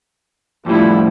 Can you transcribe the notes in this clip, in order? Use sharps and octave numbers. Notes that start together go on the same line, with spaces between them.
F2 A2 F3 G3 E4